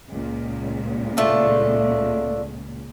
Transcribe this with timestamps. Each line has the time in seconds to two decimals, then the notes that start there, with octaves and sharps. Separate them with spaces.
0.12 C#2 A#2
1.17 A3 D4 F4